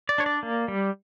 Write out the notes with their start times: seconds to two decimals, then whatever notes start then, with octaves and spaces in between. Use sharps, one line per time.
0.09 D5
0.18 D4 C#5
0.26 D5
0.43 A#3
0.68 G3